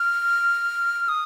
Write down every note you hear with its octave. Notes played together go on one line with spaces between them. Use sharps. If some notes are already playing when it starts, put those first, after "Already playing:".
Already playing: F6
D#6